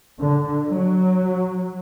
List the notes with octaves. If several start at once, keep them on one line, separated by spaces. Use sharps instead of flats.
D3
F#3